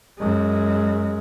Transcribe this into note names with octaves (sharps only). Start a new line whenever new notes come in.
F#2 G#3